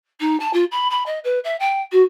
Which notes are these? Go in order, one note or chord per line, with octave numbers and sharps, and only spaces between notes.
D#4
A5
F4
B5
B5
D#5
B4
E5
G5
F#4